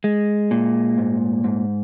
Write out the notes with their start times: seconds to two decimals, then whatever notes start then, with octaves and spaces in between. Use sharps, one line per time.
0.04 G#3
0.51 A#2
0.98 G#2
1.44 G#2